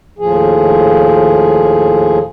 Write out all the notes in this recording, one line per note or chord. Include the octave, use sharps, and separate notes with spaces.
D#2 A2 F3 G#4